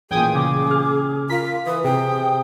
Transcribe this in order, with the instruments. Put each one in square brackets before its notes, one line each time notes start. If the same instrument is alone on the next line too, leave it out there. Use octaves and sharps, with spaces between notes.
[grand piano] A1 A#2 [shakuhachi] G#4 [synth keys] G5 G#5 D#6
[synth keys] C#3 [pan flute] D6
[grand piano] F6
[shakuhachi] F4 [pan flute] A#4 [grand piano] A#5 [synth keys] B6
[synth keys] E3 [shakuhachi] B4 [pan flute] D#6
[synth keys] C3 [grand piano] G#4 [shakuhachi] G5